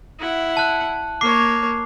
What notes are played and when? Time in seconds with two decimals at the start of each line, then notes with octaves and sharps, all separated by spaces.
0.19 E4 F#5
0.57 A5 F#6
1.21 A#3 C#5 D6 C7